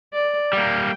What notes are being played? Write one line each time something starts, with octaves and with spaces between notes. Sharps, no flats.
D5
G3 A#3 G5